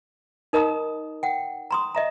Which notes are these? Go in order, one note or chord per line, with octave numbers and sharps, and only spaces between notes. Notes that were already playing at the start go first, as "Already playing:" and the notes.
D#4 A#4 D#5 A#5 D#6
F#5 G5
A#5 C6 D#6
D#5 E5 A#5